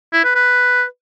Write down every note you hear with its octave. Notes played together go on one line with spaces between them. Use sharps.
E4
B4
B4